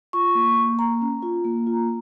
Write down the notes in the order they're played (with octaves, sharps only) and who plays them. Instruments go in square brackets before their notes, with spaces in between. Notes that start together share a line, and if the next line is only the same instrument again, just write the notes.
[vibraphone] F4 C#6
A#3
A#3
A#3 A#5
C#4
F4
A#3
F4